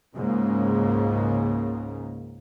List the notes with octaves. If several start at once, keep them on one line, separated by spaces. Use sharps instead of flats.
C#2 G#2 C#3 A#3